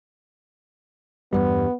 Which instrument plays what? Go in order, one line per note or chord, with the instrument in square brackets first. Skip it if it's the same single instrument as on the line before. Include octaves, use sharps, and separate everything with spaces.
[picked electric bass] E2 G2 G3 [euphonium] B3